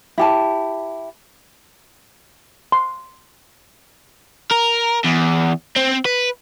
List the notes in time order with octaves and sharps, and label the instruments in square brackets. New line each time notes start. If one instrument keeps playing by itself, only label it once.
[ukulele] E4 G4 A5
[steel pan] C6
[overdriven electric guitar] A#4
E2
C4
B4